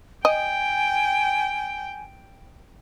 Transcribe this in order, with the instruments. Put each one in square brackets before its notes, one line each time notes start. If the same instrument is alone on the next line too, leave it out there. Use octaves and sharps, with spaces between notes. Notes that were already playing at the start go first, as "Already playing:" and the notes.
[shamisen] D#5 [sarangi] G5 [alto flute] G#5